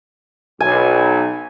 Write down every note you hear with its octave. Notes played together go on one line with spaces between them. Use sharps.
B1 G#5